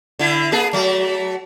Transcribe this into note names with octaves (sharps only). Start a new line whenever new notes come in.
D3 E4
A#3 G#4 A4
F#3 A3